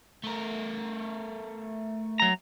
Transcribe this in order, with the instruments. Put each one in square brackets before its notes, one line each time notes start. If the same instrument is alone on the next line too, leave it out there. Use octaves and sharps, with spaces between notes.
[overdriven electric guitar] A3 A#4
[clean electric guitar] F#3 A#5